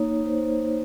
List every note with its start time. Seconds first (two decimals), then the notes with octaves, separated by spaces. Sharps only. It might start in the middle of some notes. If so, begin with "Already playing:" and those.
Already playing: A#3 D#4 C#5
0.25 C5